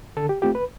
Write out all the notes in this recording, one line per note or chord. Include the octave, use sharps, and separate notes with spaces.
D3 A4
G4
A3 C4 F4 G4
B4